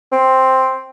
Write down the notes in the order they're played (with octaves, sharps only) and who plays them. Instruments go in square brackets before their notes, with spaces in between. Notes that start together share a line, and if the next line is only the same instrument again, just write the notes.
[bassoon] C4